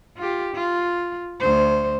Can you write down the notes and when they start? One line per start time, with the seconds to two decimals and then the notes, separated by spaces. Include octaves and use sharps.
0.18 F4 G4
0.54 F4
1.40 D2 C5